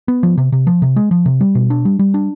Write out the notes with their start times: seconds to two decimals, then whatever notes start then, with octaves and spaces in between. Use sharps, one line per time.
0.08 B3
0.23 F3
0.38 C3
0.52 C3
0.67 F3
0.82 C3
0.96 G#3
1.11 F3
1.26 C3
1.41 G3
1.55 B2
1.70 D4
1.85 G3
1.99 G3
2.14 D4